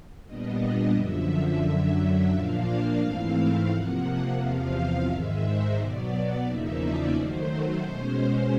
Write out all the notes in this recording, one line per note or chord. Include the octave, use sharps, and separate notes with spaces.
A#2 G3 B3 D4 D#5
D#5
F#2 D3 F3 E5
F#2 D3 F#3
A#2 F3 A#3 D4 F5
G#2 E3 A3 C4 E4
C3 F3 A#3 F#5
E2 C3 F3 F5
G#2 D#3 G#3 E5
C5
B2 F#3 B3 D5
E2 C#3 F3 A#3 D#4 E5
D5
D#3 F#3 A3 C5
C5
B2 G#3 C#4 C5